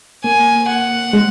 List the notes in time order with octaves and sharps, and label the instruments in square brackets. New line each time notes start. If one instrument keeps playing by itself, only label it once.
[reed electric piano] A#3 [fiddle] G#5
[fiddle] F#5
[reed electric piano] G#3